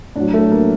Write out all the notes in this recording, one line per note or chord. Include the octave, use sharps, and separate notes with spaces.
A2 F#3 D4
A3
A#3